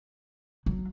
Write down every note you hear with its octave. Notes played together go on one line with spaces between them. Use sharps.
F#3